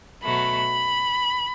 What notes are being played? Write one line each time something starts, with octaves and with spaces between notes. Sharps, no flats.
B2 F#3 A3 B5